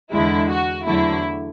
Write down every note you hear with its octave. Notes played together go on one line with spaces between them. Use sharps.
E2 D3 G#3 E4
F#4
E2 D3 F#3 A3 E4